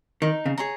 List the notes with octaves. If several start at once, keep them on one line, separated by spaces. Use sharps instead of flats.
D#3 D#4
C#3
G#4 C#5 A#5